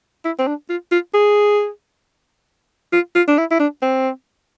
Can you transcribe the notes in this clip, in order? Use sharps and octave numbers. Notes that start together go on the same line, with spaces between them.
E4
C4
D4
F4
F4
G#4
F4
F4
D4
E4
E4
D4
C4